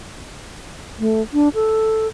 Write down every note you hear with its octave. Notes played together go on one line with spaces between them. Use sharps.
A3
D4
A4